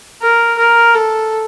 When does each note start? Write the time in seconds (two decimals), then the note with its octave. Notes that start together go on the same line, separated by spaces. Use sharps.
0.21 A#4
0.58 A#4
0.95 A4